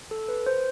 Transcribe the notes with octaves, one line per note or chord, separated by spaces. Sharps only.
A4
B4
C5